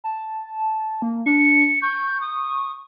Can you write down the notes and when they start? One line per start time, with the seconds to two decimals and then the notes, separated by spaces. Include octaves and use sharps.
0.04 A5
1.02 A#3
1.26 D4 C#7
1.82 C#6 G6
2.21 D#6